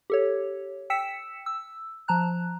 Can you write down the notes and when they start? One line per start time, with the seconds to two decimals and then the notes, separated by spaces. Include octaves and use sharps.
0.10 G4 A4 C#5
0.90 G5 E6 B6 C#7 E7
1.46 E6
2.08 F3 A5 A#5 F#6